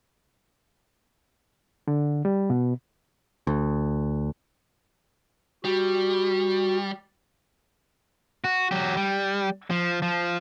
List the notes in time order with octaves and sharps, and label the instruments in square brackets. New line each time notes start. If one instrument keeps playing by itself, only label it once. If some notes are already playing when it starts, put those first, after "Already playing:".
[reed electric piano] D3
G3
B2
[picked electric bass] D2
[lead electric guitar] G3 [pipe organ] F#4
[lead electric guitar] F#4
F#3 G4
G3
F3
F3